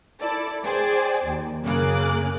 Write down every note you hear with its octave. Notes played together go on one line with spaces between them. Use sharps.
E4 A4 D5
G#4 C5 D5 G5 G#5
D#2
F#2 C#3 A#3 G#4 D6 F#6